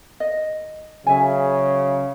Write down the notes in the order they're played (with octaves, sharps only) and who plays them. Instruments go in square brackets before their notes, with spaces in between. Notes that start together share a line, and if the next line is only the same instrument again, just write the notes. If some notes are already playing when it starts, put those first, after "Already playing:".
[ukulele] D#5
[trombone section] C#3 F#3 [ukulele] E5 G#5